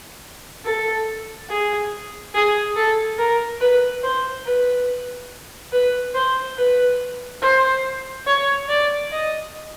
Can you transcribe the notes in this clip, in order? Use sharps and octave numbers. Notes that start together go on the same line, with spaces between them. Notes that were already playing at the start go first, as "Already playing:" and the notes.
A4
G#4
G#4
A4
A#4
B4
C5
B4
B4
C5
B4
C5
C#5
D5
D#5